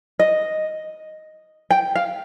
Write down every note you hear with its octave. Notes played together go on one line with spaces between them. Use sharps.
D#5
G5
F5